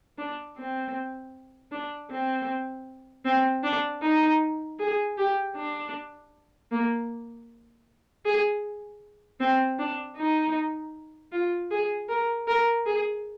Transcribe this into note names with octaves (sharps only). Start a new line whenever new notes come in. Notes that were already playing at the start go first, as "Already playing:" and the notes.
D4
C4
D4
C4
C4
D4
D#4
G#4
G4
D4
A#3
G#4
C4
D4
D#4
F4
G#4
A#4
A#4
G#4